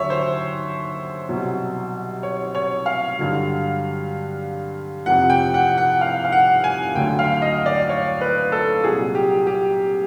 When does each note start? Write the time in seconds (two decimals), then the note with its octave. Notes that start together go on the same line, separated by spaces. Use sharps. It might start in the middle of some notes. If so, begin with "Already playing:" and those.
Already playing: D#2 D3 F#3 C#5 E5
0.10 C5
1.29 C2 B2 F#3
2.23 C#5
2.55 C#5
2.86 F5
3.18 G2 D3 F#3
5.06 F2 C3 F3 F#5
5.30 G5
5.54 F#5
5.77 F#5
6.01 F5
6.25 F5
6.32 F#5
6.64 G#5
6.95 D2 D3 F#3 G5
7.19 F5
7.42 D#5
7.66 D5
7.89 C#5
8.21 B4
8.52 A4
8.84 C2 A#2 F#3 G#4
9.15 G4
9.47 G4